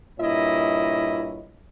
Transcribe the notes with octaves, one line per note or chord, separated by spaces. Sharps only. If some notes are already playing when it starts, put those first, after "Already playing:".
G2 A#2 E4 C#5 D#5